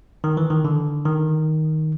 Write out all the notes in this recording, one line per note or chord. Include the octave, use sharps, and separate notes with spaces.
D#3
E3
D#3
D3
D#3